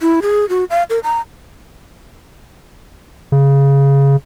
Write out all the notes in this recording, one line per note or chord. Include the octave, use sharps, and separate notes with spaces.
E4
G#4
F#4
F5
A#4
A#5
C#3